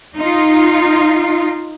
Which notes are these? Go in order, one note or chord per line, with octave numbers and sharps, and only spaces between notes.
D#4 F4